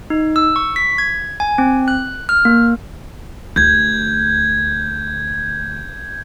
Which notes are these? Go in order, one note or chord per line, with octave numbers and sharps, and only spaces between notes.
D#4
E6
C#6
B6
G#6
G#5
C4
F#6
F6
A#3
D2 G6 G#6